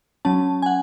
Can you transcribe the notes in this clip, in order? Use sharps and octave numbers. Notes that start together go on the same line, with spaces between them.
F#3 C#4 A5
G#5
F#5